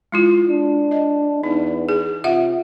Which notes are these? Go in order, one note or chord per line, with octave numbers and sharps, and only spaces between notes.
G#3 E4 F4
D4
D#5
E2 D#4
G#4
C3 F4 E5 F#5